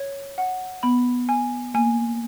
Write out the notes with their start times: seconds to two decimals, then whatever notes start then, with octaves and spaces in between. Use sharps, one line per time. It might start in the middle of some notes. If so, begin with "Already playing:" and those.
Already playing: C#5
0.38 F#5
0.83 B3 B5
1.29 G#5
1.74 A#3 G#5